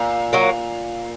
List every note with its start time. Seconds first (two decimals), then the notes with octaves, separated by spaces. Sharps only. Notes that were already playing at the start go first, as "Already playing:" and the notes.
Already playing: A#2
0.33 F#3 A#3